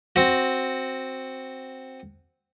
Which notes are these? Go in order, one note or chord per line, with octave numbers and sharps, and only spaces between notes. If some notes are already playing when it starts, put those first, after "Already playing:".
C4 F#4